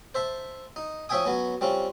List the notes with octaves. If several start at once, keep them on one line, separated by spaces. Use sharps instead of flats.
C5 E5 A5
D#4
F3 C#4 E5 G5 G#5 D#6
F#3 B3 C#4
G3 C4 C#4 F4